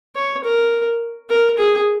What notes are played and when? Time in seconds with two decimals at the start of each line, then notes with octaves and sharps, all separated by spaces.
0.16 C#5
0.44 A#4
1.30 A#4
1.58 G#4